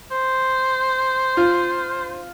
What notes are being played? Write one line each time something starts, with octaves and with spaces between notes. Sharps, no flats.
C5
F4